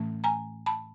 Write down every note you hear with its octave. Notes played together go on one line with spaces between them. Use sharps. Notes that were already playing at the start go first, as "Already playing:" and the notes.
Already playing: A2 E3 A3 C#4
G#5 A#5
A5 B5